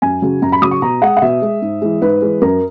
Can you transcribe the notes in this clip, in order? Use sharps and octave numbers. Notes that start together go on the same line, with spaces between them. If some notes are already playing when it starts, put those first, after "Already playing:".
F#2 G#5
C#3 F#3
F#2 A#5
B5
C#3 F#3 D#6
C#6
B2 A#5
G#3 F#5
F#5
B2 E5
G#3
G#2
E3 G#3
G#2 B4
E3 G#3
F#2 A#4